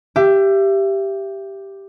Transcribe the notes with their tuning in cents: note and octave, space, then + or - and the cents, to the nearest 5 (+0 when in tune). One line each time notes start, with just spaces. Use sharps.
G4 +0 E5 +30